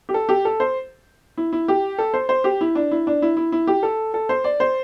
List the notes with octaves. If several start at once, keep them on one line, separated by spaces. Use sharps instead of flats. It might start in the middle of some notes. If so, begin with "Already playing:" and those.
G4
A4
G4
A4
C5
E4
E4
G4
A4
C5
C5
G4
E4
D4
E4
D4
E4
E4
E4
G4
A4
A4
C5
D5
C5